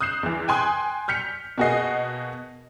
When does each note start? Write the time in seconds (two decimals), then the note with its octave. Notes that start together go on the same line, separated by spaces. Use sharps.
0.01 D#6 F#6 G6 C7 E7
0.23 E2 E3
0.48 G5 G#5 C6 D#6 F#6
1.08 F6 G6 B6 C#7 F7
1.58 B2 A#3 F#4 G#4 D#5 C7